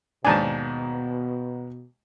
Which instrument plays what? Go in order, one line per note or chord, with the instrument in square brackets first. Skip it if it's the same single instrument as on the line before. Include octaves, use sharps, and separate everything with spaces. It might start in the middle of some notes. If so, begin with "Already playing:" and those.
[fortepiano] D#2 G#2 D4 [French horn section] B2 [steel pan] G#5 A5